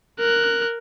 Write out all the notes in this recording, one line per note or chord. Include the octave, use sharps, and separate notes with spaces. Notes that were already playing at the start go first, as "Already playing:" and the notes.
A#4 F#6